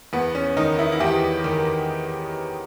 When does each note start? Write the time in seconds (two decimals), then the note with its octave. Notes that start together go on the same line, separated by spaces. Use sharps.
0.13 E2 B3
0.35 C#4
0.57 D#3 D#4
0.79 E4
0.92 E4
1.00 E2 G4
1.44 D#3